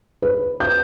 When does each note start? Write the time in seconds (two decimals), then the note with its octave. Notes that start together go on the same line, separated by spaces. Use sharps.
0.22 B4
0.60 G6